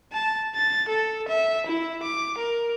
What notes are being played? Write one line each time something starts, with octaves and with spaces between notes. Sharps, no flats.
A5
A6
A4
E5
E4
D6
A#4